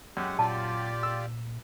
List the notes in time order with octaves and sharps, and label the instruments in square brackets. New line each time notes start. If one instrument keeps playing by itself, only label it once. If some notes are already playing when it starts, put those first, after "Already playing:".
[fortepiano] F#2 [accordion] G#3 G4 F#5
[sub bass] A#2 [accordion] F4 G4 D5 [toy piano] A5
[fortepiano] E6